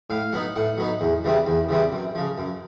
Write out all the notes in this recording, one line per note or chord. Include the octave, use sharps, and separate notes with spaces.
A2 F5
F#3 B3 D#4 F#5
A2 F#5
F#3 B3 D#4
E2
C#3 E3 G3 C4
E2
C#3 E3 G3 C4
F#2
C#3 F3
F#2